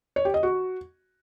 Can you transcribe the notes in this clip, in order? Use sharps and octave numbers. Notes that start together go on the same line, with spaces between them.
C#5
G4
D#5
F#4